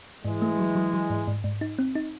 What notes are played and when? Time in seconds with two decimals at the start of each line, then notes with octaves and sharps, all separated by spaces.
0.25 G#2 E3 G#3
0.42 A3
0.59 F#3
0.76 F#3
0.93 F#3
1.10 G#2
1.27 G#2
1.44 G#2
1.61 D#4
1.79 C4
1.95 D#4